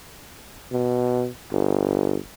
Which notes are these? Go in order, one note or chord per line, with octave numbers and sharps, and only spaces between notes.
B2
G1